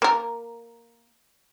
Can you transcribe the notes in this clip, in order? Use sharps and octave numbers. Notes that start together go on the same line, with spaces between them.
A#3 A#4